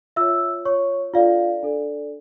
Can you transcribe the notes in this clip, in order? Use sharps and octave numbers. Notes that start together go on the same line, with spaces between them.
F4 C#5 E5 E6
F4 C#5 C#6
D4 F4 A4 D5 F5
D4 A4 D5